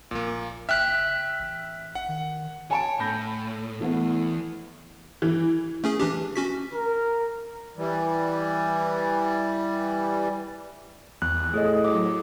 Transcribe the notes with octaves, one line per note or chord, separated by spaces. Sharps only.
A#1 A#2 A#3
F#1 E5 G5 F6 F#6 B6
A1
F#5
D#3
C#5 G#5 A5 D7
A2 B5 G6 A#6
E2 E3 A3 B3
E3
A3 C#4 G#4
E3 D4 G4
C#4 F#4 B6
A#4
E3 G3
E2 F#6
A2 G#4 D#5
F#3 D6